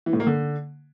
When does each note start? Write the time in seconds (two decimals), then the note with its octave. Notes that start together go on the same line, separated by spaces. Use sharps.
0.06 E3
0.13 A2
0.20 A#3
0.27 D3